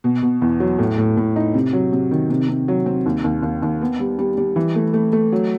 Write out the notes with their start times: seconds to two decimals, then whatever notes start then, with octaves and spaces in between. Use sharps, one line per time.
0.04 B2
0.22 B2
0.42 E2
0.60 F#3
0.79 A2
0.98 A2
1.17 A2
1.36 D#4
1.54 C3
1.73 F#3
1.92 C3
2.11 D#3
2.30 C3
2.48 C3
2.68 F#3
2.86 C4
3.06 D#2
3.24 D#2
3.43 D#2
3.62 D#2
3.81 B3
4.00 G3
4.18 G3
4.38 G3
4.56 E3
4.75 A3
4.94 A3
5.13 A3
5.32 F#3